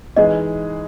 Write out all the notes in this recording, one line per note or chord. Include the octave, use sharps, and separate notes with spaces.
E3 G#3 D#4 G#4 D#5